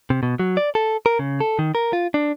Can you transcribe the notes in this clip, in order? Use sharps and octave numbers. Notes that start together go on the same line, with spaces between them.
C3
B2
F#3
D5
A4
A#4
C#3
A4
D#3
A#4
F4
D4